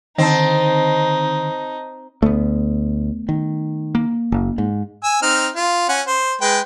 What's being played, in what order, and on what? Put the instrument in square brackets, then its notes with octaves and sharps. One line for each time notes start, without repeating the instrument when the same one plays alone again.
[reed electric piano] D3 D#3 [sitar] C4 [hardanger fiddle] D#4 [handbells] D#5 A5
[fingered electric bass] D2 [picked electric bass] A3 B3
[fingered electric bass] D#3
[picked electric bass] A#3
[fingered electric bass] F#1
G#2
[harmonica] G#5 E6
C4 D#4 F6
F4
C#4 F#5
C5
G#3 B4 G5